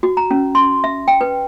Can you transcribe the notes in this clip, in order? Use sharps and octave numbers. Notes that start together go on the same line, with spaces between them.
F#4
A#5
C#4
C6
E5
G5
B4